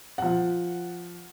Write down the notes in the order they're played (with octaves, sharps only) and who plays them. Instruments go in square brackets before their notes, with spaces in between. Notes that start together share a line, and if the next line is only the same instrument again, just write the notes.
[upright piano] F3 F#5